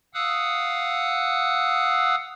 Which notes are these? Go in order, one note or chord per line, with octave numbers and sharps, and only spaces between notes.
F5 F#5 D#6 E6 F#6